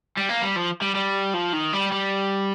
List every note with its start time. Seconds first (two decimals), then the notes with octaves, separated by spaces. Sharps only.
0.17 G3
0.29 A#3
0.42 G3
0.56 F3
0.81 G3
0.95 G3
1.34 F3
1.53 D#3
1.73 G3
1.92 G3